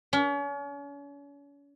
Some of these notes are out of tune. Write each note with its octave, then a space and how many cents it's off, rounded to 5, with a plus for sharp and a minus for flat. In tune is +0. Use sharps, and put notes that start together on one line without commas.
C#4 +40